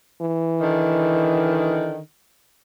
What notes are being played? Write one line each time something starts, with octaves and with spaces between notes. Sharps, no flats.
E3
D3 D#3